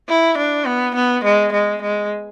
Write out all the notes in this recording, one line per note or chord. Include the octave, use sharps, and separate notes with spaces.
E4
D4
B3
B3
G#3
G#3
G#3